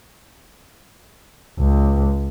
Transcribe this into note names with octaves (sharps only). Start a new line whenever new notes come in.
C#2